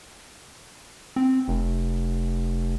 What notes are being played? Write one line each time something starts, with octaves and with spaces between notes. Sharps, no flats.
C4
F1